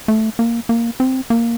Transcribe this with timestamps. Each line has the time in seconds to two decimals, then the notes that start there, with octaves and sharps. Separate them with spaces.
0.08 A3
0.39 A#3
0.69 A#3
1.00 C4
1.30 A#3